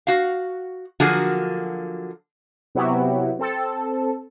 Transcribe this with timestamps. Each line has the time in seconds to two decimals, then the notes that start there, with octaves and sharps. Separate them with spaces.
0.07 F#4 F5
1.00 D3 F3 F#3 A#3 F#4 G#4
2.75 C3 F#3 B3 E4 F#4 G4
3.39 C4 A4